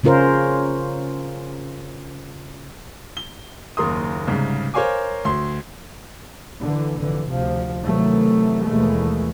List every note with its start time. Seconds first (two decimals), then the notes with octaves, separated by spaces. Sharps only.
0.04 C#3 C#4 F4 A#4 C5
3.17 G7
3.77 F#1 D#2 A#4 A#5 C6 D#6
4.27 C2 G#2 C#3
4.74 A#4 C5 C#5 F5 G#5 D6
5.25 D2 C6
6.61 D3 E3
6.98 F1 D3 E3
7.30 D2 C3 F3
7.85 C3 D#3 E3 F#3 A3
8.65 D#2 B2 E3 G#3 A3